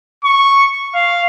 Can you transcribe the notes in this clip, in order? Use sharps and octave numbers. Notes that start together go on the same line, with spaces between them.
C#6
F5